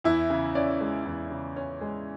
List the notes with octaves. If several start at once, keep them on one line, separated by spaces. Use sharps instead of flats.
E2 E4 E5
C#3
C#4 D5
G#3
E2
C#3
C#4
G#3